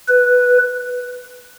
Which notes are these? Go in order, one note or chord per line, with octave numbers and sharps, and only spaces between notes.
B4